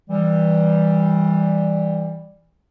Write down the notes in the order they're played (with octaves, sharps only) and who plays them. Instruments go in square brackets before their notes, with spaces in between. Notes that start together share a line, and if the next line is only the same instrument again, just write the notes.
[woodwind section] E3 G3